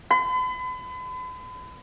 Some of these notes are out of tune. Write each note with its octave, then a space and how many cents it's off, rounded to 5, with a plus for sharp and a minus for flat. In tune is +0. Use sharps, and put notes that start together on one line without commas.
B5 +40